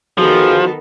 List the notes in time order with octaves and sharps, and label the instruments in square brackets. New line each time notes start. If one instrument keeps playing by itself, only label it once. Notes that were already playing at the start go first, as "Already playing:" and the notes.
[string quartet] D#3 B3 A4 [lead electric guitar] F3 [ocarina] F#4 [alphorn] G#4